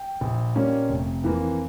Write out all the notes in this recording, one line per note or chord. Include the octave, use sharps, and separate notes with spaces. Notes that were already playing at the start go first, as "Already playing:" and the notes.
Already playing: G5
A#1
A#2 G3 A#3 C#4
F1
F2 E3 A#3